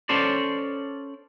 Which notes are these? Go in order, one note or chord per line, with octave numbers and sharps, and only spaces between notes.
C#4 A4 C5 D5